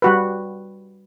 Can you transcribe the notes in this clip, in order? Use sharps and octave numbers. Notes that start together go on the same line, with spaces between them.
G3 F#4 B4